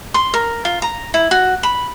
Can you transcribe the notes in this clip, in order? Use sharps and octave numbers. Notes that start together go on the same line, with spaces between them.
C6
A#4
F4
A#5
E4
F#4
B5